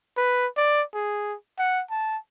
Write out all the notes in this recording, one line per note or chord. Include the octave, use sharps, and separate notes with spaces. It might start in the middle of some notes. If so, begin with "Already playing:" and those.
B4
D5
G#4
F#5
A5